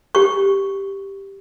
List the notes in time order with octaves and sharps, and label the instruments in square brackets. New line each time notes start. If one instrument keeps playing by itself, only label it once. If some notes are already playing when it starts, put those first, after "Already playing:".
[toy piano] G4 C#6